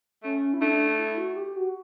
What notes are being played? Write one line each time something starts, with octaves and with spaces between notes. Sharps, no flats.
A3 C#4
E4
A3 D4
E4
F#4
G4
F#4